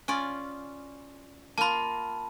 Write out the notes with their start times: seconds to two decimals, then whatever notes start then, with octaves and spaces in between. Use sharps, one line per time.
0.08 C#4 F4 D5
1.58 A#3 F4 A5 B5